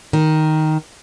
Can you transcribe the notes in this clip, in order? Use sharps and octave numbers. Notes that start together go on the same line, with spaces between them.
D#3